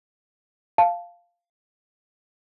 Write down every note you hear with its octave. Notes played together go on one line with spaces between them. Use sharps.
F5 A5